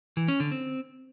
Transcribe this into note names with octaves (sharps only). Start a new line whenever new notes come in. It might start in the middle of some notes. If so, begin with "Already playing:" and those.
E3
C#4
D3
C4